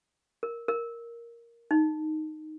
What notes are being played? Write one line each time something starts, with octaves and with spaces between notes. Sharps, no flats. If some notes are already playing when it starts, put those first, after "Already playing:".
A#4
A#4
D#4